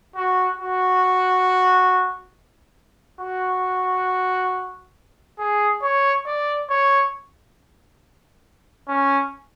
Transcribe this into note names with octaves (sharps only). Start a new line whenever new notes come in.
F#4
F#4
F#4
G#4
C#5
D5
C#5
C#4